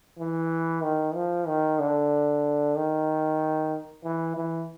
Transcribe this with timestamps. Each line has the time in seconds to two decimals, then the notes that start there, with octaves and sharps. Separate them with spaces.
0.19 E3
0.83 D#3
1.15 F3
1.47 D#3
1.80 D3
2.76 D#3
4.04 E3
4.37 E3